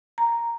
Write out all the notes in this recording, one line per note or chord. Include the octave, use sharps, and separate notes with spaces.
A#5